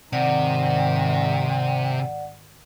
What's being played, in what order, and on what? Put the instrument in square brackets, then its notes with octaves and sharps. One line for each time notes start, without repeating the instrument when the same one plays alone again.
[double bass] G#2 D#3 [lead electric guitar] C3 [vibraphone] D5 F#5